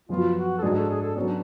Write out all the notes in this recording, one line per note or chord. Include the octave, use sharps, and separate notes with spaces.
F#2 F3 B3 F4 F#4
F#4
A4
G#2 G#3 D4 F#4 G#4
A4
G#4
A4
F#3 B3 C#4 D4